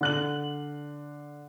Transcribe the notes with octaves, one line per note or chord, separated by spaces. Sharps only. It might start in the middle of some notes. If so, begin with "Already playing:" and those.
D3 F#6 F#7